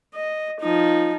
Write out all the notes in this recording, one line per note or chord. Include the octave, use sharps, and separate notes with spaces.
D#5
F3 D#4